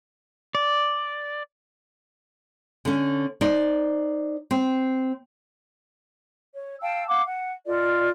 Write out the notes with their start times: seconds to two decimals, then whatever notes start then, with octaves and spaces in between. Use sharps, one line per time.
0.55 D5
2.85 D3 C#4
3.41 D#4 C5 D5
4.51 C4
6.54 C#5
6.81 F5 G5 A5 E6
7.08 F5 F#5 D6
7.25 F#5
7.65 F4 A4 D5 D#5